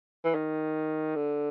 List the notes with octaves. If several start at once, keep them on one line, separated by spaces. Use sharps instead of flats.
E3
D#3
D3